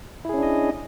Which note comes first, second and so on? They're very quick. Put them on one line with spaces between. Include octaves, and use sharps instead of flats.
E4 G#4 C#4 D4 D#5